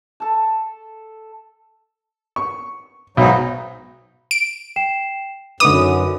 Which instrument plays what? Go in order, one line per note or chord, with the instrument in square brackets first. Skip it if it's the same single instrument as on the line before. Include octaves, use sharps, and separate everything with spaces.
[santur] A4 A5
[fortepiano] C#6
[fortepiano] B1 [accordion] G#2 F#3 D#4
[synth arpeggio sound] D7
[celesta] G5 C7 E7
[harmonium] F#2 [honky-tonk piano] D3 D#4 B4 [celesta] D6 [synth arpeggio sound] D#6